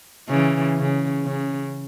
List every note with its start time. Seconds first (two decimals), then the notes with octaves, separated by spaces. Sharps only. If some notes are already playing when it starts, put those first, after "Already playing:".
0.29 C#3 E3
0.77 C#3
1.25 C#3